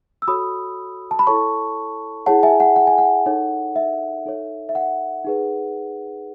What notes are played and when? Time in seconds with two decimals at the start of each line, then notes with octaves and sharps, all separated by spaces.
0.22 E6
0.28 F#4 A4 C#5 B5 D#6
1.11 A5
1.19 B5
1.27 E4 A4 C#5 A5 C#6
2.26 E4 G#4 C#5 F#5 A5
2.43 E5 G#5
2.60 F#5
2.76 F#5
2.87 G#5
2.98 F#5
3.26 D#4 A4 C#5
3.76 E5
4.26 D#4 A4 C#5
4.69 E5
4.75 F#5
5.25 D#4 G#4 B4